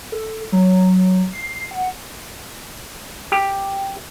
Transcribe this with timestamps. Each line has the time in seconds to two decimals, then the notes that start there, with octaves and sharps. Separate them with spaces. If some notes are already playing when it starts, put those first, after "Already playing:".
0.12 A4
0.52 F#3
1.33 C7
1.71 F#5
3.32 G4